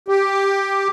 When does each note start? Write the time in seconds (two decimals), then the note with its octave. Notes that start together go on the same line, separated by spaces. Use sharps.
0.08 G4